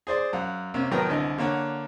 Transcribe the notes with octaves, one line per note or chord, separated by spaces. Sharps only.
G#4 C5 D5 C6
F#2 F5 F#5
C3 A#3 C#4
A2 D#3 F#3 B3 A#4 G5
C2 D3 D#5 G#5
D3 A#3 C#5 F#5